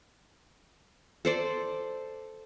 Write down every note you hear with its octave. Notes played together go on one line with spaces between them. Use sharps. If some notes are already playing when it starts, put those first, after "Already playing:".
A4 C5 D5